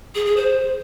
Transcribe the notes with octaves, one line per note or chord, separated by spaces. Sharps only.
G#4
G#4
C5